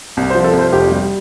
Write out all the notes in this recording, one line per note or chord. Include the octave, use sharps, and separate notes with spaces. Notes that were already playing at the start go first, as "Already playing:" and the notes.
C2
C5
F3
A4
C2
C5
F1 G4
G3